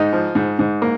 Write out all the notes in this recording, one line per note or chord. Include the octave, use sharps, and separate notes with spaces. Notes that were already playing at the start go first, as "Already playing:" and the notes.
Already playing: G#2 D#4
F3
G#2
G#2
A#3